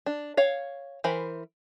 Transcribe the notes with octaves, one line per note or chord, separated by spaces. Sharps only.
D4
C#5 F5
E3 A#4 C5 B5